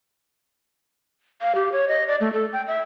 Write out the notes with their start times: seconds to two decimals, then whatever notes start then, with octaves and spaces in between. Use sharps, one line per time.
1.42 F5
1.55 G4
1.72 C#5
1.88 D#5
2.08 D5
2.21 A3
2.33 A4
2.53 G5
2.67 E5